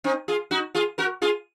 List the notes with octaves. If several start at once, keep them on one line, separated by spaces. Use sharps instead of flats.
C4 D#4
F4 G#4
D#4 F#4
F4 G#4
F#4 A#4
F4 G#4